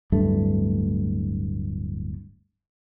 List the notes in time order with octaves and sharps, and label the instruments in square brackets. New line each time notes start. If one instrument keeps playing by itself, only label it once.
[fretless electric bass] D1 G2 A3